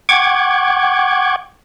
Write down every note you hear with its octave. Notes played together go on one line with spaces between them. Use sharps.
F#5 G5 C#6 D6 G#6